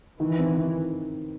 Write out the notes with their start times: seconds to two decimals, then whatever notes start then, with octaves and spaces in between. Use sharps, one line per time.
0.20 D#3 E3
0.39 C4
0.56 D#3